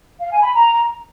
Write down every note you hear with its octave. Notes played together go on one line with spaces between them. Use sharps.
F5
G#5
B5
A#5